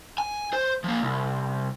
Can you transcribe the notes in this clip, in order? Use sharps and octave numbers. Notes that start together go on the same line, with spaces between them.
G#5
C5
F3 A#3
C2